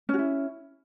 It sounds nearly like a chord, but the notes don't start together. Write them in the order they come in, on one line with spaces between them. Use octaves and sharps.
C#4 F#4 E4